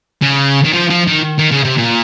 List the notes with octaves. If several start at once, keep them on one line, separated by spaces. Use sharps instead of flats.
C#3
D#3
F3
F3
D#3
D#3
C#3
C3
A#2